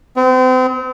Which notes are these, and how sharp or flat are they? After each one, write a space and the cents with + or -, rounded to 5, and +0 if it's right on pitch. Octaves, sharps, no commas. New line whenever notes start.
C4 -35